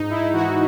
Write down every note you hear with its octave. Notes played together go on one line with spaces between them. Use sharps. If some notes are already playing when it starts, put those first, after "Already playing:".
Already playing: G#2 D#4
E4
E3 F#4